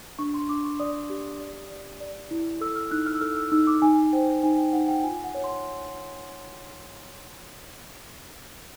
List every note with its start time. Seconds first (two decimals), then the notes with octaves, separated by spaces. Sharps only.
0.19 D4 C#6
0.34 C6
0.49 D4 D6
0.64 C#6
0.80 D5 D#6
1.10 G4
1.40 D5
1.70 D5
2.00 D5
2.31 E4
2.61 A4 E6
2.76 F6
2.91 D#4 F#6
3.06 F6
3.15 E6
3.21 A4 F6
3.37 E6
3.52 D#4 E6
3.67 D6
3.82 D#4 G#5
4.13 C5 G5
4.43 D#4 G#5
4.58 G5
4.73 D#4 F#5
4.88 G5
5.03 F4 G#5
5.24 F#5
5.35 C#5
5.44 C6